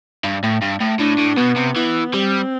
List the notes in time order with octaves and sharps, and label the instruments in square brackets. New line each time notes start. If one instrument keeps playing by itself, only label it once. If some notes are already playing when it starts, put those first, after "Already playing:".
[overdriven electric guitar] G2
A2
G2
A2
[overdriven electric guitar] A2 [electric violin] D4
[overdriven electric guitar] A2
[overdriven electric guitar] B2 [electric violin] B3
[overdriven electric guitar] C3
[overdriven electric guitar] E3 [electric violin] B3
[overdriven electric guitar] G3 [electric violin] C4